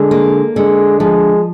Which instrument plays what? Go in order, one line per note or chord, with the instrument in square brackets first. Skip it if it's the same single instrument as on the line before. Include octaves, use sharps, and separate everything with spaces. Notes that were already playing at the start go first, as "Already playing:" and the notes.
Already playing: [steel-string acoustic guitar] D3 [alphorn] G#3
[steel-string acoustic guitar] A#3
[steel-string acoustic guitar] D3 [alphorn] G#3
[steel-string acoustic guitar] F3 [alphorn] G#3